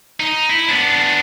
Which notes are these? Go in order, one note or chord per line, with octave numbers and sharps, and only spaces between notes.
D#4
E4
B3 D4